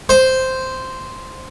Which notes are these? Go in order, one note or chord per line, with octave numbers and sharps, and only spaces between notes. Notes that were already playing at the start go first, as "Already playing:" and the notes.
C5